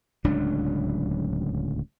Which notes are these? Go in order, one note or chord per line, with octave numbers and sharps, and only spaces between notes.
D1 C#2 F#3 D4